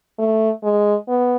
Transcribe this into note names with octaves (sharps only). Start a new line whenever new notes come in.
A3
G#3
B3